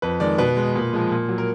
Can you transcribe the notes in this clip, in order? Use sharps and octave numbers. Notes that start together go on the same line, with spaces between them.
F2 B4
D#3 G#3 D5
B2 B4
G#3
A#2
F3 G#3
A#2
F#3
A#4